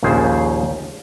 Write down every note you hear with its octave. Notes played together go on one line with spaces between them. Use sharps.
A#1 D#2 C#3 G#4 C5